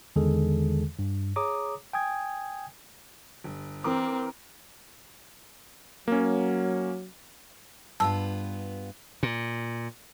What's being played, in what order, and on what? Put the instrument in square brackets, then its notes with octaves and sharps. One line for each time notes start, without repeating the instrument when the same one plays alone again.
[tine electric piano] E2 D3 D#3 G#3 G#4 A4
G2
G#4 C#5 A#5 D6 D#6
G5 G#5 D#6 G#6
[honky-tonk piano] G1
[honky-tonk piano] E3 A#4 D6 [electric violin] C4
[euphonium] F#3 [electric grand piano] A#3 C#4
[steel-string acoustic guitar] G2 B3 F4 [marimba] A5 E6
[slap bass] A#2